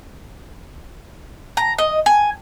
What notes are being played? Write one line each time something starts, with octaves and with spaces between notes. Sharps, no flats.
A#5
D#5
G#5